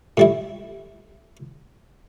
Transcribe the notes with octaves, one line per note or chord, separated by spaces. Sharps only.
A2 G3 E4